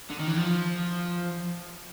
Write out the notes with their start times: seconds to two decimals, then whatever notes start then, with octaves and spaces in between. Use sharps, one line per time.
0.10 D3
0.19 D#3
0.27 E3
0.36 F3